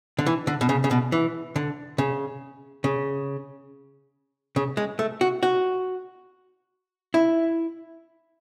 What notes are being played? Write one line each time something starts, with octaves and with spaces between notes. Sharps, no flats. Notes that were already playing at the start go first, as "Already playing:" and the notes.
D3
E3
D3
B2
C#3
C#3
B2
E3
D3
C#3
C#3
C#3
G#3
A3
F#4
F#4
E4